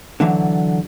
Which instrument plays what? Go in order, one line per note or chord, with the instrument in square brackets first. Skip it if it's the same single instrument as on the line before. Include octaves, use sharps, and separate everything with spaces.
[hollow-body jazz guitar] D3 E3 F#3